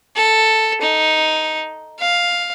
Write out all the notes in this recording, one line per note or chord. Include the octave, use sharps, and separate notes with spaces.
A4
D#4
F5